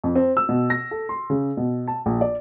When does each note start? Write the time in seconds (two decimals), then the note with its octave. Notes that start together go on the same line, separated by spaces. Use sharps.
0.04 F2
0.16 C4
0.37 E6
0.49 B2
0.70 A#6
0.91 A4
1.09 C6
1.30 C#3
1.57 B2
1.88 A5
2.06 A#1
2.21 D5